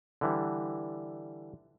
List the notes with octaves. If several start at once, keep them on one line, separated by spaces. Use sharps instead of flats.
D3 E3 G3